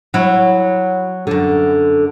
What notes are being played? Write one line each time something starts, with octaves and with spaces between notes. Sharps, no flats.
F#3 E4
F#2 D3